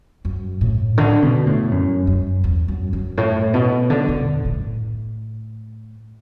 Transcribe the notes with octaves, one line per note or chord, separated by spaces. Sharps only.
F#2
A2
D3
B2
A2
F#2
F#2
E2
F#2
F#2
A2
B2
D3
D3
E2
A2